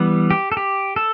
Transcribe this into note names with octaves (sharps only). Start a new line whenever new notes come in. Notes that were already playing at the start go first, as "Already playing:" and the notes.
Already playing: E3 G3 B3
G4
A4
G4
A4